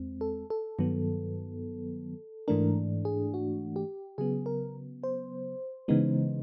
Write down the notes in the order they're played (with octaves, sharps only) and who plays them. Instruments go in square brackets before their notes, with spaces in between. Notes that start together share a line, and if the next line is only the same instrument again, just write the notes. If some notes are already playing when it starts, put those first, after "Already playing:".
Already playing: [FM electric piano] E2 G#3 C4
A4
A4
G2 D#3 F#3 B3
G#2 E3 A3 D4 A#4
G#4
F#4
G4
C#3 F#3 B3 G#4
A#4
C5
C#3 E3 G#3 B3 D#4